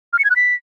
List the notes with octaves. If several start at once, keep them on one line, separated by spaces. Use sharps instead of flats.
F6
C#7
G#6
F#6
B6